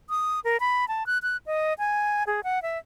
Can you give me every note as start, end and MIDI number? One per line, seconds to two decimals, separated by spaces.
0.10 0.40 87
0.44 0.57 70
0.60 0.88 83
0.88 1.06 81
1.06 1.18 90
1.23 1.37 90
1.46 1.74 75
1.79 2.24 80
2.27 2.41 68
2.44 2.62 78
2.62 2.78 76